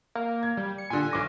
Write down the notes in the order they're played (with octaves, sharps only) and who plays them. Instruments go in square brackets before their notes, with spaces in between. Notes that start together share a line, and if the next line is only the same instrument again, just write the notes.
[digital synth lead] A#3
[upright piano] G#6
[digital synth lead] G3
C#7
[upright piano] A#2 D3 [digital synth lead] G#5
[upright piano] B1 D6 A#6